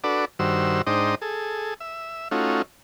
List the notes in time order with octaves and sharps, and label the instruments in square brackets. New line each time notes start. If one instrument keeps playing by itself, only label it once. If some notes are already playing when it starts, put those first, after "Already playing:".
[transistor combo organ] D4 F#4 A4 B4 D5
G2 D#3 F#4 C5 E6
G#2 D4 D#4 C5 D#5 G5
G#4 A4
E5
A3 C#4 D#4 F4 F#4